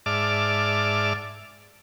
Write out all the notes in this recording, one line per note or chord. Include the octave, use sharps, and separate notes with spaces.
G#2 D5 E5 A5 D6 F6